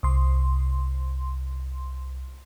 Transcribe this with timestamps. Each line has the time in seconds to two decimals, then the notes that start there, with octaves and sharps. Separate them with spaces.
0.03 C2 C6